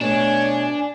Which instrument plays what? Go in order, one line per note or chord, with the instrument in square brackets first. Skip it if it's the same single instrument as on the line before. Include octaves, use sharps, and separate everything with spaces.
[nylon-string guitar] B2 A3 [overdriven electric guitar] D4 [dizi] C#5 [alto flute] G#5